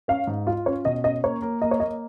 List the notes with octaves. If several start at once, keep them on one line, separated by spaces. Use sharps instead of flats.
C#4 F5
G#2
F4 F5
C#4 C#5
B2 D#5
C#4 D#5
A#3 C#5
A#3
A#3 D#5
C#5
A#3 D#5